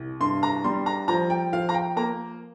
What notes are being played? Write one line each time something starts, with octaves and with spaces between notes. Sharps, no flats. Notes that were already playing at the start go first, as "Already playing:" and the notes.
Already playing: C2
G2 C6
A#5
G3 C6
A#5
F3 A#5
G5
F3 F5
A#5
G5
A#3 A#5